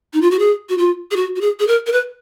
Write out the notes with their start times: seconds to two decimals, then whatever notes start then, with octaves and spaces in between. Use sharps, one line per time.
0.13 D#4
0.21 F4
0.31 F#4
0.39 G#4
0.69 F#4
0.78 F4
1.11 G#4
1.16 F#4
1.36 F#4
1.41 G#4
1.60 G#4
1.67 A#4
1.87 A#4
1.92 B4